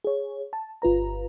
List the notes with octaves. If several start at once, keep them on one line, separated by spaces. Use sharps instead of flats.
G#4 C#5
A5
G1 F4 B4 A#5